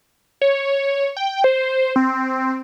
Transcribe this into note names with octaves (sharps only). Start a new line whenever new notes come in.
C#5
G5
C5
C4